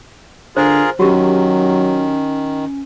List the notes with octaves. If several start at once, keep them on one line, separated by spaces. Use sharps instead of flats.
D3 F4 G#4 A#4 C5
D#3 F#3 C#4 F#4 G4